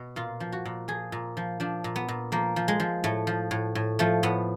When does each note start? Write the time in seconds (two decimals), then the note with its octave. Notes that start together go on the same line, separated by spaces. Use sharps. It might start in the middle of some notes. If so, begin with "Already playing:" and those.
Already playing: B2
0.16 A#2 F4
0.40 F3
0.52 F#4
0.65 A#2
0.88 F3 G#4
1.12 A#2
1.37 F3
1.60 F3 D4
1.84 A#2
1.96 B3
2.08 A#2
2.32 F3 A#3
2.56 F3
2.68 G#3
2.80 F3
3.04 A2 A3
3.27 F3
3.51 A2
3.75 A2
3.99 F3 A3
4.23 A2 B3